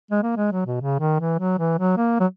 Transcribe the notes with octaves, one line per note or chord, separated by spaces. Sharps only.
G#3
A#3
G#3
F#3
B2
C#3
D#3
E3
F#3
E3
F#3
A#3
F#3